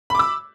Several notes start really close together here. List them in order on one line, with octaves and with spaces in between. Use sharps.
B5 D6 E6